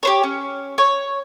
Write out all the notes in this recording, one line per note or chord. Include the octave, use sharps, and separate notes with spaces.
G4 C5 C#5
C#4
C#5